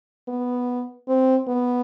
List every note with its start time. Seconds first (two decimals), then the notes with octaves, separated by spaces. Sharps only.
0.28 B3
1.08 C4
1.48 B3